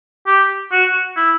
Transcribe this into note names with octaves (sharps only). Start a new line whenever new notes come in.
G4
F#4
E4